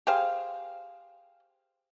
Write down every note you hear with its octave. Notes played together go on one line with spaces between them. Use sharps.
G4 G#4 C5 F5